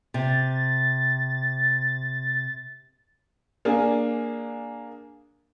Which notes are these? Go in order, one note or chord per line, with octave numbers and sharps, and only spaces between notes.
C3 A6
A#3 D4 G#4 G#5